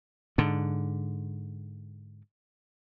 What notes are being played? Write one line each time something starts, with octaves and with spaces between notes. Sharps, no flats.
G#2 D3